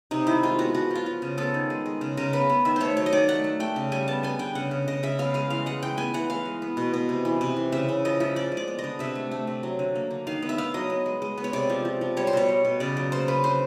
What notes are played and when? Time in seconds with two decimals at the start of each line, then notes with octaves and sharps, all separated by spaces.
0.11 C3 D#4
0.27 D#3 E4
0.43 G#3 F4
0.59 B3 F#4
0.74 F3 F#4
0.90 F3 F4
1.06 F3
1.22 C#3
1.38 B3 A4
1.54 D#3
1.70 G#3
1.86 G#3
2.01 C#3
2.17 C#3 A#4
2.33 B3 B4
2.50 B3
2.65 D#3 E5
2.76 A3 C5 C#5
2.97 F#3 C#5
3.06 D#5
3.12 D#3 D5
3.28 A3 F#5
3.44 A3
3.60 A3 G5
3.76 C#3
3.92 G3 G#5
4.08 B3 A5
4.23 B3 G#5
4.39 D3 G5
4.55 C#3 F#5
4.71 C#3
4.88 C#3 D#5
5.03 C#3 E5
5.19 B3 F5
5.34 G#3 F5
5.50 E3 F5
5.66 G#3 F#5
5.82 E3 G5
5.98 B3 G#5
6.14 E3 F#5
6.30 E3 F5
6.45 G#3
6.62 B3
6.77 B2
6.93 B2
7.09 C3
7.25 E3
7.41 C3
7.57 E3
7.72 C#3 E5
7.89 C#3
8.05 F3 D#5
8.20 F3 E5
8.36 F3 D5
8.52 G#3
8.57 D5
8.68 B3
8.79 D#5
8.84 D3
8.99 C3 E5
9.15 A3
9.31 A3
9.47 C3
9.63 F#3
9.79 D3
9.95 A#3
10.11 D3
10.27 D#3 F5
10.42 B3
10.49 E5
10.58 B3 F5
10.74 F#3 D#5
10.90 B3
11.06 G#3
11.22 G#3
11.38 B3
11.44 C#5
11.53 C3 D5
11.70 F3
11.85 F3
12.01 F3
12.17 G3 C#5
12.27 C5
12.33 B2 C#5
12.49 G3
12.65 B2
12.80 C#3 D5
12.97 F#3
13.12 A#3 C5
13.28 C#3 B4
13.44 D3 C5